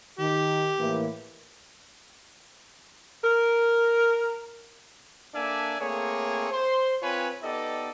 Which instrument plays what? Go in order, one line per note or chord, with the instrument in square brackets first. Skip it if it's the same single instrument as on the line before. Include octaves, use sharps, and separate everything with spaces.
[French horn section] D#3 [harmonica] G4
[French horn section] A2 E3 A#3
[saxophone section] A#4
[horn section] A#3 D4 A4 D5 E5 G#5
A3 A#3 C4 G#4 C#5
C5 C6
C4 F4 B4 C#5 G#5
B3 D#4 G4 A4 D5 D#5